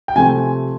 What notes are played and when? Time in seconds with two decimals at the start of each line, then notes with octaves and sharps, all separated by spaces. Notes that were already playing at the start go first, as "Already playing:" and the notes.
0.08 G5
0.16 C3 F3 A3 C4 G#5